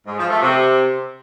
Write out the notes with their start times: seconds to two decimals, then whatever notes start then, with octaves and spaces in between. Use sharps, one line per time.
0.07 G#2
0.19 F3
0.30 A3
0.42 C3